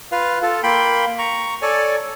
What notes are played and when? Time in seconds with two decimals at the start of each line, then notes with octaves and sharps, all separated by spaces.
0.12 F4 B4 F5
0.42 F4 A4
0.63 A#3 G5 B5 C6
1.19 A#5 C#6
1.62 A4 C#5 D5 G#5